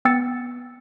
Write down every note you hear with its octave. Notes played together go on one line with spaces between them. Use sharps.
B3 G5 E6 A6 C#7